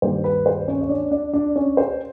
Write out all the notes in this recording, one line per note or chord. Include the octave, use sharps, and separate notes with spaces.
G2 D#3 G3 A#3 C5
B4
C5
C#4 C#5
C#5
D4 D5
D4 D5
D4 D5
C#4 C#5
C5